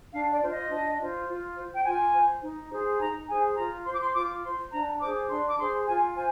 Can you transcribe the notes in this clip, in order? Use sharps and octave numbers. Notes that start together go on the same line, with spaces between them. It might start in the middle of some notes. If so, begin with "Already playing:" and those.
D4 F5
D5
F4 C5
D#5
D4
F4 C5
F4
C5
G5
F4 G#5
C5
D#4
G#4 C5
D#4 A#5
G#4 C5 G#5
F4 A#5
C5 C6
D6
C6
F4 D6
C5 C6
D4 A#5
G#4 C5 D6
D4 C6
D6
G#4 C5 C6
F4 G#5
C5 G#5